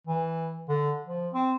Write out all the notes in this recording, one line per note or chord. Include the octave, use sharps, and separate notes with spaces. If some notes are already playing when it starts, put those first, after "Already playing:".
E3
D3
F3
C4